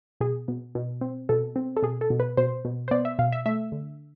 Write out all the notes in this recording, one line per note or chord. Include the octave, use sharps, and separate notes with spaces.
B2 G#4
B2
B2
C4
B2 A4
C4
A4
B2 G#4
A4
B2
B4
B2 C5
B2
C5
B3 D5
E5
B2 F5
E5
A3 E5
D3